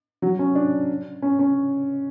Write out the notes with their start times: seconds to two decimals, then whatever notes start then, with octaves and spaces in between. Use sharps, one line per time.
0.22 F#3
0.39 C#4
0.55 D4
1.22 C#4
1.39 C#4